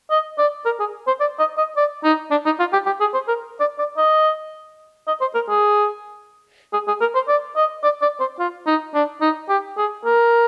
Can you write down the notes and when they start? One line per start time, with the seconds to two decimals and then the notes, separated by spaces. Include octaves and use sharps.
0.10 D#5
0.38 D5
0.65 A#4
0.80 G#4
1.07 C5
1.20 D5
1.39 D#5
1.57 D#5
1.76 D5
2.04 D#4
2.31 D4
2.45 D#4
2.59 F4
2.73 G4
2.86 G4
3.00 G#4
3.13 C5
3.28 A#4
3.60 D5
3.79 D5
3.97 D#5
5.07 D#5
5.21 C5
5.35 A#4
5.49 G#4
6.73 G#4
6.87 G#4
7.01 A#4
7.15 C5
7.28 D5
7.56 D#5
7.83 D5
8.02 D5
8.20 C5
8.39 F4
8.67 D#4
8.94 D4
9.21 D#4
9.49 G4
9.77 G#4
10.05 A#4